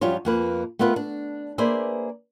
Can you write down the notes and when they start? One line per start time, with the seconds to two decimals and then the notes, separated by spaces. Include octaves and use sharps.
0.01 F#2 F3 G3 F4 C#5
0.25 F2 A#3 B4
0.79 A3 B3 C4 F4 A#4 B4
0.96 D4
1.58 A#3 G#4 B4 C5 D5 E5